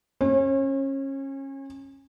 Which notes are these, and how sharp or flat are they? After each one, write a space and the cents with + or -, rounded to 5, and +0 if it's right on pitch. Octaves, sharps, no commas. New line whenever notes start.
C#4 -25 C#5 -40